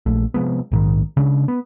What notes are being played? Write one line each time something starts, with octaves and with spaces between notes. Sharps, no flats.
A#1 A3
C3 F3 G#3 B3
A#1 G#2 D#3
C#3 G#3 D4
B3